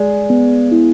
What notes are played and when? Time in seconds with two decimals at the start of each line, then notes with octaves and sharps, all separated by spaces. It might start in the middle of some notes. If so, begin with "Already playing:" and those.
Already playing: G#3 D5
0.30 B3
0.72 E4